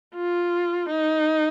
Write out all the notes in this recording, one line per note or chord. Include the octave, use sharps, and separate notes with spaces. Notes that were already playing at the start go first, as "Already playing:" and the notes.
F4
D#4